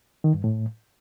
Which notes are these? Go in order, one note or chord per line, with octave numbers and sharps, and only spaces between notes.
D#3
G2
A2